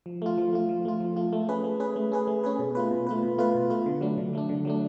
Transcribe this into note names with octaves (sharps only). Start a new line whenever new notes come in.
F3
A3 F4
F3
A3 F4
F3
A3 F4
F3
A3 F4
A3
C#4 G#4 B4
A3
C#4 G#4 B4
A3
C#4 G#4 B4
A3
C#4 G#4 B4
B2
A3 F4 B4
B2
A3 F4 B4
B2
A3 F4 B4
B2
A3 F4 B4
D3
F#3 A3 D4
D3
F#3 A3 D4
D3
F#3 A3 D4